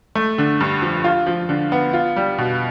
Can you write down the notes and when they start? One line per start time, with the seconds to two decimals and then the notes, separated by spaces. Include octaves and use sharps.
0.15 A3
0.38 D3
0.60 G2
0.82 F3
1.04 F4
1.27 F3
1.49 D3
1.72 B3
1.93 F4
2.16 G3
2.38 B2